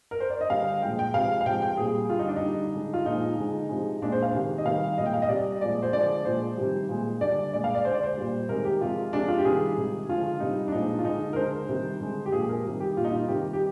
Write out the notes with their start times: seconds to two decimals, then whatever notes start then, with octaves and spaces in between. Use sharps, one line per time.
0.11 A#4
0.20 C5
0.30 D5
0.41 D#5
0.50 D3 G3 F5
0.82 A#2 F3 G#3 G5
0.99 G5
1.14 C3 F3 G#3 F5
1.41 F5
1.46 C3 F3 G#3 G5
1.62 G5
1.77 A#2 G3 G#4
2.09 D3 G3 F4
2.19 D#4
2.28 D4
2.36 D#4
2.42 D3 G3
2.74 D3 G#3
2.94 F4
3.06 A#2 F3 G#3 D#4
3.38 D3 G#3
3.69 C3 F3 G#3
4.02 A#2 G#3 D4
4.12 C5
4.23 F5
4.34 C3 D#3 G#3
4.58 D#5
4.65 C3 D#3 G3 F5
4.98 A#2 G#3 D#5
5.06 G5
5.14 F5
5.22 D#5
5.29 C3 G3 D5
5.61 A#2 F3 G#3 D5
5.82 C5
5.93 D3 F3 G#3 D5
6.25 A#2 F3 G#3 C5
6.57 C3 D#3 G3
6.89 A#2 G#3
7.21 D3 G3 D5
7.53 A#2 G#3 D5
7.64 F5
7.75 D5
7.85 D3 G#3 C5
7.94 D5
8.03 C5
8.17 A#2 G3
8.49 C3 D#3 G#3 A#4
8.65 G4
8.81 C3 F3 G#3 F4
9.13 C3 F3 G#3 D4
9.28 F4
9.38 G4
9.45 C3 D#3 G3 G#4
9.77 C3 D#3 G#3
10.08 D3 F3 G#3 F4
10.40 C3 G3 D#4
10.67 D4
10.72 A#2 F3 G#3 D#4
10.99 F4
11.05 D3 G#3 D#4
11.33 A#4
11.36 D3 G#3 C5
11.69 C3 D#3 G3
12.01 D3 G#3
12.26 G4
12.32 A#2 F3 G#3 G#4
12.49 A#4
12.65 C3 D#3 G3
12.80 G4
12.97 A#2 G3 F4
13.04 D#4
13.12 F4
13.28 C3 D#3 G3 G4
13.53 G4